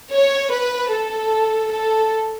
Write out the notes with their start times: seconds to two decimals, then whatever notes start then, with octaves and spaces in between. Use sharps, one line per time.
0.14 C#5
0.52 B4
0.92 A4
1.71 A4